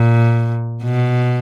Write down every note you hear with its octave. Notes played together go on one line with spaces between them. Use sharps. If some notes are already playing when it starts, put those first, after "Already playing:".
Already playing: A#2
B2